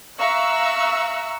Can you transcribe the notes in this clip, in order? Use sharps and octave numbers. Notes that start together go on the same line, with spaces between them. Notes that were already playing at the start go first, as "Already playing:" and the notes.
E5 F5 A#5 C#6 E6 F#6